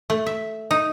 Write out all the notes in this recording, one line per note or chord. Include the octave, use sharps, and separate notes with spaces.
A3
E5
D#4